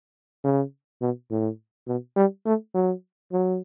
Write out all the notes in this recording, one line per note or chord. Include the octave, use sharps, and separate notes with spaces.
C#3
B2
A2
B2
G3
A3
F#3
F#3